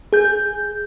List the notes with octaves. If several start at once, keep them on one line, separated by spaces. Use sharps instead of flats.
G#4 G6